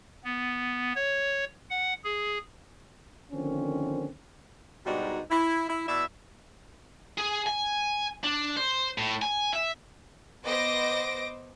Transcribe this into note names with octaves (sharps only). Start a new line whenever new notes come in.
B3
C#5
F#5
G#4
D3 D#3 F3 A#3 C4 C#4
G#2 B2 G3 D4 D#4 F#4
E4
E4
B2 E4 D5 E5
G#4
G#5
D4
C5
A2
G#5
E5
B3 C5 D#5 D6 A#6 D7